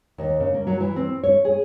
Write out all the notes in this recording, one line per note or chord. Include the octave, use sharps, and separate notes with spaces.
D#2
C#3
A#3
F#3
E3
C4
C#5
G#4